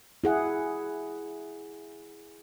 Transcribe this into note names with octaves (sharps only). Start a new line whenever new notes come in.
E4 G#4 F#5